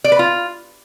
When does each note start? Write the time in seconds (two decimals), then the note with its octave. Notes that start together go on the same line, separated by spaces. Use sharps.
0.04 D5
0.12 B4
0.19 F4